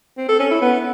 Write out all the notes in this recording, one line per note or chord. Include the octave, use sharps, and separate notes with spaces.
C4
A4
C#4
E4
B3